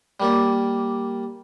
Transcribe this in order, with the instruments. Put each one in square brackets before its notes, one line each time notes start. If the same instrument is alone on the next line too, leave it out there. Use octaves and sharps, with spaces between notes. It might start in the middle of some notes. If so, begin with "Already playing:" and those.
[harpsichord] G3 A#3 D5